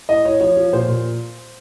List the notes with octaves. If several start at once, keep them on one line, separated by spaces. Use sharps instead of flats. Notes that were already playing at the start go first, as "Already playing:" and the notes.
A2 D#5
A2 C#5
F3 C#5
F3
A#2 C5
A#2